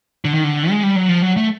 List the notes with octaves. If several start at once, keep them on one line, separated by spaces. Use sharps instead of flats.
D3
D#3
D3
G#3
G3
F#3
F3
F#3
A3